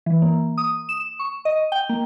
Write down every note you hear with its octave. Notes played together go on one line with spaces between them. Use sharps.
E3
A#3
D#6
E7
C#6
D#5
G5
A#3